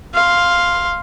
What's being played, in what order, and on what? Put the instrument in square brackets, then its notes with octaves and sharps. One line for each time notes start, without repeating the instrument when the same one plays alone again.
[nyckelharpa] F5 C6